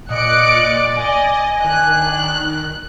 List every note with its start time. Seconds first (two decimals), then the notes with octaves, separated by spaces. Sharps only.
0.10 A#2 D5 D#5 F#6 C#7 D7
0.97 D#5 G#5
1.64 D#3 D4 F#6